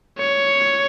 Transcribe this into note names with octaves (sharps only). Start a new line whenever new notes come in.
C#5